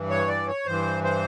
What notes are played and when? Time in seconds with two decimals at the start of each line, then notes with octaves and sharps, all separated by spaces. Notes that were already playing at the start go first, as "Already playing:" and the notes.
Already playing: G2 E3
0.10 C#5
0.28 D5
0.47 C#5
0.66 G2 E3 C5
1.04 C5